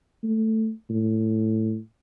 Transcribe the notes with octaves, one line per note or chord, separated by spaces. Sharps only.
A3
A2